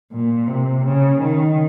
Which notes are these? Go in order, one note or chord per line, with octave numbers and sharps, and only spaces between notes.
A#2
C3
C#3
D#3